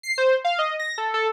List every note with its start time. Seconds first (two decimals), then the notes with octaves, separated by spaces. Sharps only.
0.03 C7
0.18 C5
0.44 F5
0.59 D#5
0.79 A#6
0.98 A4
1.14 A4